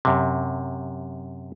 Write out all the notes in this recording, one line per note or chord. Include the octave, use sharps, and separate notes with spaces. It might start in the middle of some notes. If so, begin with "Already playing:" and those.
F#2 C3